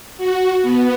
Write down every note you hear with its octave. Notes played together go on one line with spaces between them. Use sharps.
F#4
B3